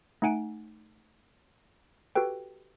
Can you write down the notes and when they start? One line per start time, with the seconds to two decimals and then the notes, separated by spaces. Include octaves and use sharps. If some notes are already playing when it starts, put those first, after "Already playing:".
0.22 A3 D#4 F#5 G#5 D7
2.15 F#4 G4 A4 B4 G5